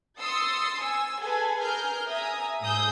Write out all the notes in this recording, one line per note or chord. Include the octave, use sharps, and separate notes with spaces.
C6 D#6 E6 A6 C#7
G#5 E6
G#4 A4 B4 G#5
G#4 A#4 F6 G6
E5 G#5 A#5 D#6
G#2 G#4 D#6 E6 G6